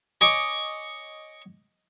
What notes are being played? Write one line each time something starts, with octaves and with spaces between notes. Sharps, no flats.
C#5 D#5 G#5 C#6 D6